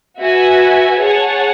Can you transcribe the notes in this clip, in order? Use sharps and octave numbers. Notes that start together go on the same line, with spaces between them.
F#4 B4 E5 G#5
G#4 C#5 F#5 A5